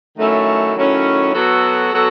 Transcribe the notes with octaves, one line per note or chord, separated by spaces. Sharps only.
D#3 F#3 A3 C#4 E4
D#3 F#3 A3 C#4 E4
F#3 B3 F#4 A4
F#3 B3 F#4 A4